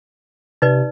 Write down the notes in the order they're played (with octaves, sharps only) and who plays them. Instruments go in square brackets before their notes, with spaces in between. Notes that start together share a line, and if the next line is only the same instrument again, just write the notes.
[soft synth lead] C3 [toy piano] D#4 B4 D5